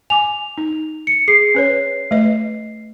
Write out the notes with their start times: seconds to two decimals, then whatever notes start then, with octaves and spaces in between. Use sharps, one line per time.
0.10 G#5 D6 F7
0.58 D#4
1.07 C#7
1.28 G#4 C7
1.55 C#4 B4 C#5
2.11 A3 B4 D#5